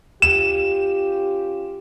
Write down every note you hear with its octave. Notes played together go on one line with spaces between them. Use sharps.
C#4 F4 G4 E7